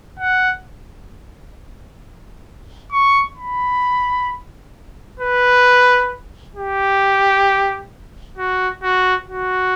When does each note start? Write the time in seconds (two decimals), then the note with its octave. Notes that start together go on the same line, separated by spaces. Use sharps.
0.19 F#5
2.92 C#6
3.37 B5
5.19 B4
6.55 G4
8.38 F#4
8.83 F#4
9.28 F#4